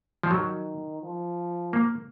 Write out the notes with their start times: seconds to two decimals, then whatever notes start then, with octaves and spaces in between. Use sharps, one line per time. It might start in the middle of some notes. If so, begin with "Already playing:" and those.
0.23 F3
0.30 D#3 F#3
1.02 F3
1.73 A#3